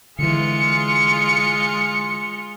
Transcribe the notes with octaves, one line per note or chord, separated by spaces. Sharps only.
D3 E3 G#3 F4 C#7